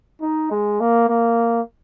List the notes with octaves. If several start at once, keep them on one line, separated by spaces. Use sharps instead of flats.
D#4
G#3
A#3
A#3